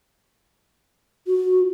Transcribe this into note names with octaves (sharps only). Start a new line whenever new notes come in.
F#4